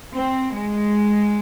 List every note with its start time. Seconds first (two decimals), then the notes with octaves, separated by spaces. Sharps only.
0.14 C4
0.54 G#3